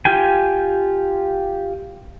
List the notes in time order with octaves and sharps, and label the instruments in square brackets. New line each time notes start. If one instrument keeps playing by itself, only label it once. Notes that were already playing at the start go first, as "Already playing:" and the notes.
[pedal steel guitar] F4 G4 G5 G#5